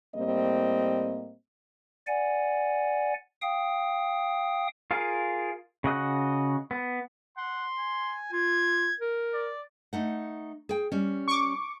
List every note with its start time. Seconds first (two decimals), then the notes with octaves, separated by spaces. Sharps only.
0.15 A2 G3 A#3 C4 D#5
2.07 D5 F#5 G#5
3.42 F5 G5 D#6
4.91 F4 G#4 A#4 F5
5.84 C#3 F#4 D#5 F#6
6.71 B3
7.37 F#5 C6
7.78 G#5
8.32 F4 G#6
9.00 A#4
9.34 D5
9.93 A3 D#4 F#5
10.69 G#4 G5
10.92 G3 C#4
11.28 C#6 D6